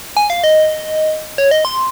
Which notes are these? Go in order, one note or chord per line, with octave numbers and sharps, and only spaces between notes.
G#5
F5
D#5
C#5
D#5
C6